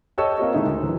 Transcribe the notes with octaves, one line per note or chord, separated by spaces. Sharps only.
G4 A4 C#5 D#5 C#6 E6
A#3 C4 F4 G4 C#5 D#5
D#3 G#3 D#4 E4
D2
D3 E3 F#3